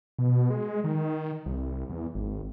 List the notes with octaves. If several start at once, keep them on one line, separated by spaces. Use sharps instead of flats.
B2
G#3
D#3
C2
E2
G#1